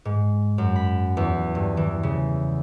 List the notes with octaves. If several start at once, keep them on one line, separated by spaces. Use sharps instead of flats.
G#2
F#2
B5
E2
G2
E3
C#3